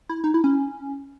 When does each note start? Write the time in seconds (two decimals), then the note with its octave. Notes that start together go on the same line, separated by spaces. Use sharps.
0.09 E4
0.24 D#4
0.34 E4
0.44 C#4